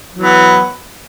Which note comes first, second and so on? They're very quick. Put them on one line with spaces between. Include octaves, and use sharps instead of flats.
F#3 E3 B3